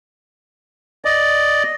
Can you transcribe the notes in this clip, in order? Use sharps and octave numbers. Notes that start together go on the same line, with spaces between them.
D5 D#5